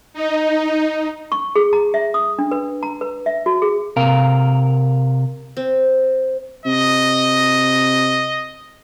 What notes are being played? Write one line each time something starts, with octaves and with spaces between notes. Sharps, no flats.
D#4
C#6
G#4
A#5
E5
D#6
D4
B4
A#5
B4
E5
F#4
G#4
C3 A#4 F5
C4
C3 D#5